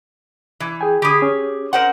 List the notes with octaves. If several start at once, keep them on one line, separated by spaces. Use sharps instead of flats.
E3
G#4 G5 G#5
D3 G4 G#4 B5 D#6
C#4
A#4 C5 F#5